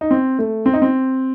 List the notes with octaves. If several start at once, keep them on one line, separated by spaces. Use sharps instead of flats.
D#4
C4
A3
C4
D#4
C4